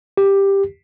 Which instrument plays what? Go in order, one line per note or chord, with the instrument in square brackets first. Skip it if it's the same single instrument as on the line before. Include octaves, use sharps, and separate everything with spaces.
[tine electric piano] G4